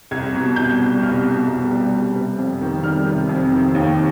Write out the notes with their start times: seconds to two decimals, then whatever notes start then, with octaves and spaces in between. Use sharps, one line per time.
0.11 C2 G#6
0.35 B2
0.56 C2 G6
0.80 G3
1.02 C2 F6
1.25 B2
1.48 C2
1.71 G3
1.93 G3
2.16 C3
2.39 F2
2.61 D#3
2.84 G3 F6
3.06 C3
3.29 F2
3.52 D#3
3.75 D#2